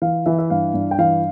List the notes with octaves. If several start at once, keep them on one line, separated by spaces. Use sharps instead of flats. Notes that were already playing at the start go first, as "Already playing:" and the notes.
E3 F5
E3 E5
E5
G2 F5
G2
G5
E3 F5